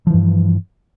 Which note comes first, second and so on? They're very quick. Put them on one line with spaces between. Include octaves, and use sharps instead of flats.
F3 E3 G2